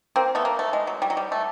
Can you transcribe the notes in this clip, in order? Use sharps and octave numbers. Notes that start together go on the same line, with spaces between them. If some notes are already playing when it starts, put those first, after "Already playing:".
A#3 C4
A3 B3
A#3
A3
G#3
F#3
G3
F#3
G3
A3